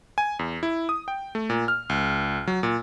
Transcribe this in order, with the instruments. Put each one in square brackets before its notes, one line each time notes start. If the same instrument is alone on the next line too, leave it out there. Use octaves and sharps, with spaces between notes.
[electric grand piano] G#5
E2
E4
D#6
G5
A3
A#2
F6
C#2
F#3
A#2